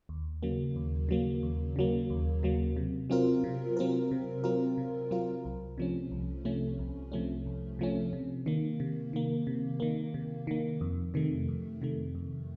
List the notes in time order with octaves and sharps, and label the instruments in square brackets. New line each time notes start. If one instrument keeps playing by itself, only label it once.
[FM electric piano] D#2
C#3 F#3 A#3
D#2
C#3 F#3 A#3
D#2
C#3 F#3 A#3
D#2
C#3 F#3 A#3
C3
F#3 C4 F4 A#4
C3
F#3 C4 F4 A#4
C3
F#3 C4 F4 A#4
C3
F#3 C4 F4 A#4
C2
C3 F3 A3 C#4
C2
C3 F3 A3 C#4
C2
C3 F3 A3 C#4
C2
C3 F3 A3 C#4
C3
D#3 A#3
C3
D#3 A#3
C3
D#3 A#3
C3
D#3 A#3
F2
C3 D#3 A3
F2
C3 D#3 A3
F2